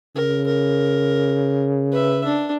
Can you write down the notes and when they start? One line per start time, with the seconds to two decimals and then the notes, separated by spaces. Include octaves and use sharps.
0.15 C#3 A#4
0.47 A#4
1.92 B4 E5
2.25 D4